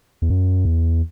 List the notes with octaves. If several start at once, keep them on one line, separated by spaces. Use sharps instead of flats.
E2
F#2
E2